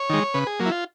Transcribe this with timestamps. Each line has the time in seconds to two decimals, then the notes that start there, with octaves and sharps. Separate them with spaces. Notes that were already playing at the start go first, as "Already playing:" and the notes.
Already playing: C#5
0.10 D#3 G#3
0.34 C#3 B4
0.47 G#4
0.60 F#3 A#3
0.66 E4
0.71 F4